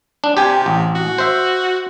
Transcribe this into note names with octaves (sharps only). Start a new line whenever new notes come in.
D4
C3 G4 G#5
A1
F#4
C5 E5